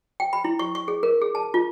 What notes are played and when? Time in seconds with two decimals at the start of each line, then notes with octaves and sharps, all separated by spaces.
0.20 G5
0.33 B5
0.44 E4
0.59 C#6
0.75 C#6
0.88 G#4
1.03 A#4
1.22 G#4
1.35 A5
1.54 F4